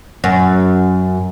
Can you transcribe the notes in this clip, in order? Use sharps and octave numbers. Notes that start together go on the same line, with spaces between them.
F#2